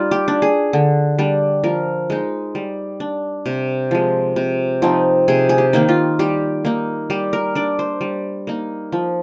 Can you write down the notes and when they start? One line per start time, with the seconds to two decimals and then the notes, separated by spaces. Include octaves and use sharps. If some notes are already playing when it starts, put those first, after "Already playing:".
Already playing: G3 D#4 F4
0.11 G4
0.28 D4
0.42 G#4
0.73 D3
1.19 G3 D4
1.64 F3 A#4
2.10 G#3 D#4
2.55 G3
3.00 D4
3.46 C3
3.91 F3 G#3
4.36 C3
4.82 F3 C4 D#4
5.28 C3 G#4
5.49 G#4
5.58 G4
5.73 D#3 A#3 D#4
5.89 F4
6.19 G3 G4
6.65 A#3 D#4
7.10 G3 G4
7.33 A#4
7.55 D4 D5
7.79 C5
8.01 G3
8.47 A#3 D#4
8.92 F3